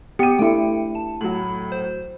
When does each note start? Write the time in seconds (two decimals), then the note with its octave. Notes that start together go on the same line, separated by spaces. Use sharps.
0.19 B3 G4 C#7 D#7
0.39 A3 D4 E4 G5
0.95 A5
1.21 A2 F#3 B5
1.72 C5